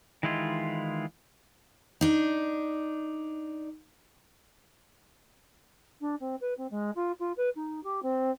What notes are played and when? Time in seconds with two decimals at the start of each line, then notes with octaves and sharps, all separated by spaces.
0.23 D#3 E3 G#3 E4 F4
2.01 D4 D#4
6.00 D4
6.20 C4
6.41 B4
6.57 C4
6.71 G#3
6.95 F4
7.19 F4
7.37 B4
7.55 D#4
7.83 G4
8.02 C4